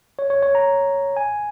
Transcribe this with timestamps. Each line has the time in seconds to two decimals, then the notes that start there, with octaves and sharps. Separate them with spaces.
0.19 C#5
0.30 C#5
0.43 C#5
0.55 A#5
1.17 G#5